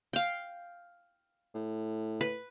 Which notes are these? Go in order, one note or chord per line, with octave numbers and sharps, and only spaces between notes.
F5 G5
A2
B4